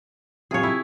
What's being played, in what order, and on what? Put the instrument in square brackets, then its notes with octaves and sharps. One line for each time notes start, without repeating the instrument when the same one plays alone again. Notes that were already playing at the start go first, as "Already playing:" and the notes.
[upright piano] C3 F4 A4 [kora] G#4 C#5
[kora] E4